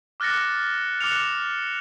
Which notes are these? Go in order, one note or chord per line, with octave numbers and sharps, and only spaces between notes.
D6 F6 F#6 A6 A#6 C#7
D6 F6 F#6 C#7 F7